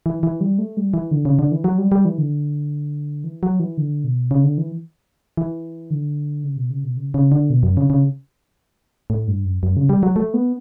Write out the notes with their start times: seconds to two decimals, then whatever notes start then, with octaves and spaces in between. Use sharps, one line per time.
0.06 E3
0.23 E3
0.41 G3
0.58 A3
0.77 G3
0.94 E3
1.11 D3
1.25 C#3
1.39 D3
1.52 E3
1.64 F#3
1.78 G3
1.92 G3
2.05 E3
2.18 D3
3.24 E3
3.43 F#3
3.60 E3
3.77 D3
4.04 B2
4.31 C#3
4.44 D3
4.58 E3
5.37 E3
5.91 D3
6.44 C#3
6.57 B2
6.70 C#3
6.84 B2
6.97 C#3
7.14 C#3
7.32 D3
7.50 B2
7.63 F#2
7.77 C#3
7.90 C#3
9.10 A2
9.28 G2
9.45 F#2
9.63 F#2
9.77 C#3
9.89 G3
10.03 F#3
10.16 A3
10.34 B3